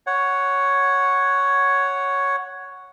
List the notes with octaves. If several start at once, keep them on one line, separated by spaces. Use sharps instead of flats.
C#5 F#5